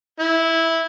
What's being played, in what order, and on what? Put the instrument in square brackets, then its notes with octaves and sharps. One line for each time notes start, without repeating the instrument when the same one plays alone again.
[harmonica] E4